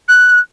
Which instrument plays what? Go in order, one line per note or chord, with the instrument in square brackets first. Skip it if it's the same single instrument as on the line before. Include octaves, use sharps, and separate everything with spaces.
[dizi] F#6